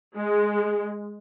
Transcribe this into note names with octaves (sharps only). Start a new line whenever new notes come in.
G#3